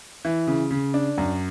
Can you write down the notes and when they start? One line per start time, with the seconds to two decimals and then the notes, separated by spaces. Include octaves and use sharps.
0.25 E3
0.47 C#3
0.71 C#3
0.94 D4
1.18 F#2